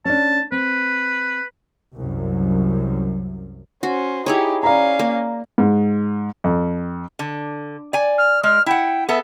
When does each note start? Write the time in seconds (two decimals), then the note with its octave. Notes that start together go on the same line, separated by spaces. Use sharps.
0.05 C#4 D4 A5
0.52 C4 B4
1.96 C2 F#2
3.83 C#4 F#4 C5
4.26 D#4 E4 G4 G#4 C#5
4.63 C#4 D5 F5 A#5
4.99 A#3
5.58 G#2
6.44 F2
7.19 D3
7.93 D5 G#5
8.18 F6
8.43 G#3 F6
8.66 E4 F#5 G5
9.09 B3 G#4 A4 E5